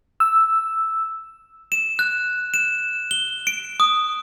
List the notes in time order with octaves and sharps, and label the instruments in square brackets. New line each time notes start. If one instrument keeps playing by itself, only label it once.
[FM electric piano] E6
[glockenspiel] E7
F#6
E7
G7
D7
D#6